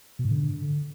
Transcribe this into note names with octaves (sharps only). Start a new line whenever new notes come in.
B2
G#2
D3